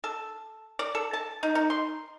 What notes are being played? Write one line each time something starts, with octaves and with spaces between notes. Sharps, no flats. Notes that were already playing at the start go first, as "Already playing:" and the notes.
A4
D5
A4
A5
D#4
D#4
C6